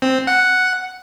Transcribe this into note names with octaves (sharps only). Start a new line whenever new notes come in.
C4
F#5